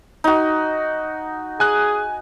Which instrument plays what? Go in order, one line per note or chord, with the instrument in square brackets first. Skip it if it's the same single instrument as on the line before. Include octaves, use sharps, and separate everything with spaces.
[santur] D#4 F#4
[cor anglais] G#4 [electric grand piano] G#5 F#6